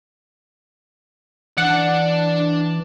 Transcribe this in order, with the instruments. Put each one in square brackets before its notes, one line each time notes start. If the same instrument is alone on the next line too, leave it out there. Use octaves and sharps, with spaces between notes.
[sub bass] E3 [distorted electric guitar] D4 D5 [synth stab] F#5